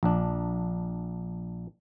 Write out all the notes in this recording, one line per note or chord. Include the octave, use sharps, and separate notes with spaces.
A#1 D4